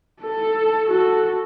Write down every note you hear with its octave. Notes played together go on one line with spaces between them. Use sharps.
A4
F#4 A4